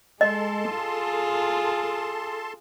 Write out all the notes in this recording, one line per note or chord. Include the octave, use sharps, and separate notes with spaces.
G#3 A4 D#5 A5 C6
F4 G#4